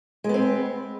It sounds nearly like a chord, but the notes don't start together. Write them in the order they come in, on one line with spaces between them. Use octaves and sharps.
G#3 B3 C4